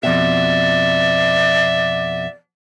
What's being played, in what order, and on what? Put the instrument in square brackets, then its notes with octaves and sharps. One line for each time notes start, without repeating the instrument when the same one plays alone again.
[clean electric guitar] F2 B2 [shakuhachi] D5 [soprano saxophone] E5